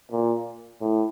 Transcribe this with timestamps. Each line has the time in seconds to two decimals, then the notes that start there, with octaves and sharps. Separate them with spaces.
0.11 A#2
0.81 A2